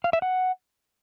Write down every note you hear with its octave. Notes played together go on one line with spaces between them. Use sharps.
F5
E5
F#5